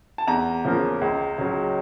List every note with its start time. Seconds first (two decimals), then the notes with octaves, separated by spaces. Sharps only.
0.18 A5
0.27 E2 A#5
0.65 C#3 F3 A#3
1.01 C#2
1.38 C#3 F#3